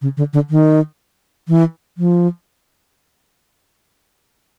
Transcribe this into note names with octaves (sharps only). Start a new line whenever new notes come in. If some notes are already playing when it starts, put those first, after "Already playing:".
C#3
D3
D3
D#3
E3
F3